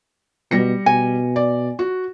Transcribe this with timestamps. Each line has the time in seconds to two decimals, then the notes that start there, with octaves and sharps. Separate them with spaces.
0.51 B2 G3 A#6 C#7
0.86 B2 G#5
1.36 D5
1.79 F#4